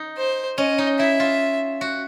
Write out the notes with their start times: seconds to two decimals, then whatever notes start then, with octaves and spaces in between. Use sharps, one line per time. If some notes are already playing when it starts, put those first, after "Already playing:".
Already playing: D#4
0.17 C5
0.58 C#4 D#5
0.78 D#4
0.99 E4 E5
1.20 F4
1.81 F#4